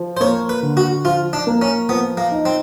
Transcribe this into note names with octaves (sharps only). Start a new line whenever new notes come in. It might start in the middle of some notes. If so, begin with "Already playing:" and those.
Already playing: F3
C5
A#3 C#5
B4
D3
F#4
F3 F4
D4
A#3
C#4
F3 B3
A#3
D#4
C4